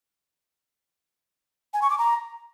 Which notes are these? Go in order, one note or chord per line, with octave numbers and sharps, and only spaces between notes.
G#5
C#6
D6
A#5